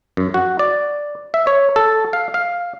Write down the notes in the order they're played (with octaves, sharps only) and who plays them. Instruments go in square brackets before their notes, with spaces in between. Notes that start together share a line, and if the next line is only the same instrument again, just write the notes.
[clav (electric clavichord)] F#2
F#4
D5
E5
C#5
A4
F5
F5